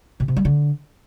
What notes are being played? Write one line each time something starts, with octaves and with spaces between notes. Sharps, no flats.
B2
C3
G3
D3